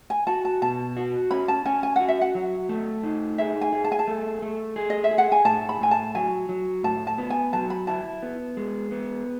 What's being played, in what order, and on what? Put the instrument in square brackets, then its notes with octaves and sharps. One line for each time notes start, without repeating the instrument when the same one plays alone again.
[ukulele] G#5
[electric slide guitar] F#4 [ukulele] A5
[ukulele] A5
[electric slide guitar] B2 [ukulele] A5
[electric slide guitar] F#4
[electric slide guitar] C#4 [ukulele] B5
[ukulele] A5
[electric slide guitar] C#4 [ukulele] G#5
[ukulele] G#5
[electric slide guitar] F#4 [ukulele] F#5
[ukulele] E5
F#5
[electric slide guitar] F#3
A3
D#4
[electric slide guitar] G#4 [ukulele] E5
[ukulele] G#5
[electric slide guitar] G#4
[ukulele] A5
G#5
A5
[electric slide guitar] A3
A3
G#4
[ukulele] D#5
E5
[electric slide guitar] G#4
[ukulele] F#5
G#5
[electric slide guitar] A2 [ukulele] A5
[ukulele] B5
[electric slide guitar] A2 [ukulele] G#5
[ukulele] A5
[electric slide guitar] F#3 [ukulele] G#5
[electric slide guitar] F#3
[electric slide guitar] A2 [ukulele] A5
[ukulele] A5
[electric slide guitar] B3
[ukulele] G#5
[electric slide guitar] F#3 [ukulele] A5
[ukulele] B5
[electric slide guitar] E4 [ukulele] A5
[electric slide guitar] B3
G#3
B3